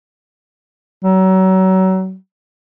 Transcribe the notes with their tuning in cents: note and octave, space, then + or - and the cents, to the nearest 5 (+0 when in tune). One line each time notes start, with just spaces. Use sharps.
F#3 +30